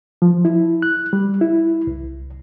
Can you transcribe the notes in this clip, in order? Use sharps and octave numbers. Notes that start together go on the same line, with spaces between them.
F3
E4
F#6
G3
E4
C2